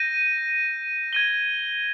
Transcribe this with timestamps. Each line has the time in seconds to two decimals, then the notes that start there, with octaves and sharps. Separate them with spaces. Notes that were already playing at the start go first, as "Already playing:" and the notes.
Already playing: G6 A#6 D#7
1.13 G#6 D#7 G7